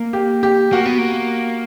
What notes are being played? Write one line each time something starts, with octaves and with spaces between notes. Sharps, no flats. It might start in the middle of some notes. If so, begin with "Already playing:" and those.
Already playing: A#3
G4
G4
A#3 F#4
B3
A#3